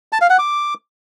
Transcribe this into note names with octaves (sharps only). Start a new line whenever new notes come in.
A5
F5
F#5
D6